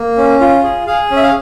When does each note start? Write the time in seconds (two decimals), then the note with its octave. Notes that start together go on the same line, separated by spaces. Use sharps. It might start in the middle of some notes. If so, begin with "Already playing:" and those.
Already playing: A#3
0.17 C#4
0.41 F4
0.64 G#4
0.87 G#4 F5
1.11 C#4
1.16 E5
1.22 F5